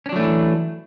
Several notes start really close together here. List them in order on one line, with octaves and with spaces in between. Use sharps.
C#4 D4 F#3 A3 E3